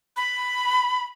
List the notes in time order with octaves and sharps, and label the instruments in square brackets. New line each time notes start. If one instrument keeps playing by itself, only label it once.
[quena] B5